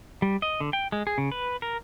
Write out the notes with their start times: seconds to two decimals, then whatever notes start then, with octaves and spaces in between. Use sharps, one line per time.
0.22 G3
0.42 D#5
0.60 D3
0.73 G5
0.92 G#3
1.07 G#4
1.18 C#3
1.32 B4
1.62 A#4